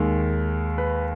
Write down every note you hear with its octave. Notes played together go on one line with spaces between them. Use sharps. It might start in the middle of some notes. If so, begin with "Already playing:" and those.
Already playing: D#2 D#3 G#3 A#4
B4